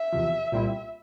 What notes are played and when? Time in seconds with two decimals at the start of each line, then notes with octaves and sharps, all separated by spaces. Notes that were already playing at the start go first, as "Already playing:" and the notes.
Already playing: E5
0.13 E2 C3 F3
0.52 C2 A#2 G3 C4 E4